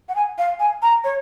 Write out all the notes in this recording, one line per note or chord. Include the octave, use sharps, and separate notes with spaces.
F#5
G#5
F5
G#5
A#5
C#5